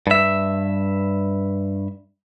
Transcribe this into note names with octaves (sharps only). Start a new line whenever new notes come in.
G2 E5